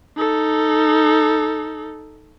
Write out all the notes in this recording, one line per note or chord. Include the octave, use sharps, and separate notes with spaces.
D#4 A4